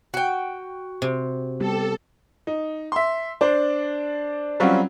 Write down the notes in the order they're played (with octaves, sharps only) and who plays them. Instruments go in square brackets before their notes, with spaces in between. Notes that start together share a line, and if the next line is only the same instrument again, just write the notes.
[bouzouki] F#4 G5
[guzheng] C3
[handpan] G3 B3 G4 [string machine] A4
[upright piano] D#4
E5 C6
D4 C5 D5
F#3 G3 C4 C#4 F4 F#4